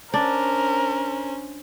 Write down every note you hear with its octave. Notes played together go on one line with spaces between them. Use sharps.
C#4 D4 A#4 C5